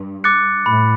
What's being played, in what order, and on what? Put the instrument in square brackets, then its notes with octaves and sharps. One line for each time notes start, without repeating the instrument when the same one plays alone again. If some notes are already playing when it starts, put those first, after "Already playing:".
Already playing: [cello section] G2
[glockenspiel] D6 F#6 A6 C#7
[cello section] A2 [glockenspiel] B5